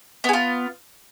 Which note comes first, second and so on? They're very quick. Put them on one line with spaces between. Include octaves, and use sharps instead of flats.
B3 G#4 F4